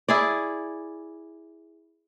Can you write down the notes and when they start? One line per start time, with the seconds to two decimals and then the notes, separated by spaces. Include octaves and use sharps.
0.09 E4 G#4 D5